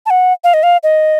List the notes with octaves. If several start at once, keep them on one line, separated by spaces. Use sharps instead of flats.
A5
F#5
F5
D#5
F5
D#5